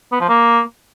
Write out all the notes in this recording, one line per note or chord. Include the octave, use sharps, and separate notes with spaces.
B3
F3
A#3